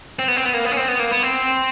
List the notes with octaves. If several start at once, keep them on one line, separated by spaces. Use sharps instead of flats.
C4
B3
C4
B3
A#3
B3
C#4
C4
B3
A#3
B3
C4